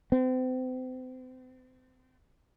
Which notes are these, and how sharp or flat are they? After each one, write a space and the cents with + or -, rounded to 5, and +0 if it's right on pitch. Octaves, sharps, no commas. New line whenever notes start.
C4 -35